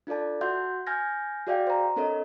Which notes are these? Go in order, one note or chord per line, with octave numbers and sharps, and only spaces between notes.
D4 F4 A4 D5 A5
F#4 E5 F#5 C6 G6
G#5 F6 G6 G#6 A#6
F#4 G#4 D5 E5 F5 G5
C5 A#5
C4 D4 A4 A#4 C#5 D#5